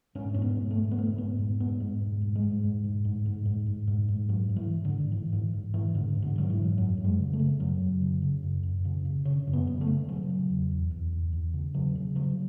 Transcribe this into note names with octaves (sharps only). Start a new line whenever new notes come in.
G#2 C#4
G#2 C#4
B3
G#2
A3
G#2
B3
G#2 A3
G#2 B3
G#2
G#2 B3
G#2 G#3
G#2
G#2
G#3
G#2
G#2
G#2
G#2
G#2
G#2
G#2
G#2
G#2
G#2 F#3
G#2
E3
G#2
D3
G#2
G#2 E3
G#2 E3
G#2
G#2 E3
G#2 D3
G#2
D3
G#2 F#3
E3
G#2
F#2 F#3
F#2
G#3
C#3
A3
C#3
F#2 F#3
F#2
C#3
C#3
F#2
F#2
C#3
C#3
C#3 C#4
F#2
B3
C#3
A3
C#3
C#3 F#3
C#3
E2
E2
E2
E2
E2
C#3
C#3 F#3
C#3
C#3 F#3